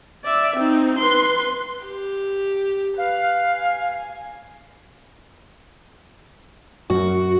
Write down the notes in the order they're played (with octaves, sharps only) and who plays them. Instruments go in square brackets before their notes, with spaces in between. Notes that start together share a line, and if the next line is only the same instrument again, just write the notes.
[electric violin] D5 E5
C4 D#4
B4 C6
[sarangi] G4
[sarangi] B4 [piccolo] F5
[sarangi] G#5
[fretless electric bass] F#2 [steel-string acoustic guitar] F#4